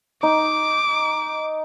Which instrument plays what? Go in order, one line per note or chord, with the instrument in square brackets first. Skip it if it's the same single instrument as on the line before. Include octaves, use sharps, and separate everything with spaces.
[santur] D#4 [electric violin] D6